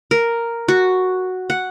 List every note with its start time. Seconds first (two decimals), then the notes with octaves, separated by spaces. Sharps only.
0.11 A#4
0.68 F#4
1.50 F#5